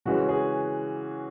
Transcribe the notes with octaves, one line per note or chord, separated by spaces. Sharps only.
C#3 E3 G#3 C#4 F#4
G#4